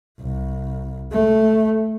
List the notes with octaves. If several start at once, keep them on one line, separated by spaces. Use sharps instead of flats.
C2
A3